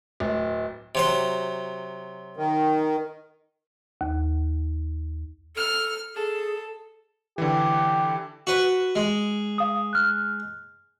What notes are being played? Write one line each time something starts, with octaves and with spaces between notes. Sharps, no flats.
D1
C3 F#3 C5
D#3
D#2
A4 F6
G#4 A4
D3 E3 G4
F#4 B4
G#3
F5 D#6
F6 F#6